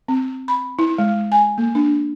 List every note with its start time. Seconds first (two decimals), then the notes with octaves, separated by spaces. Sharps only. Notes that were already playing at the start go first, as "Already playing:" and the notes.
0.08 C4
0.48 B5
0.79 E4
0.98 G#3
1.32 G#5
1.58 A#3
1.75 D4